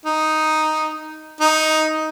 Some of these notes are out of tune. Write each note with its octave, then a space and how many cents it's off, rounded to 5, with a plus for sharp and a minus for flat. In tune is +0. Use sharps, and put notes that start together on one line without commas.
D#4 +0
D#4 +5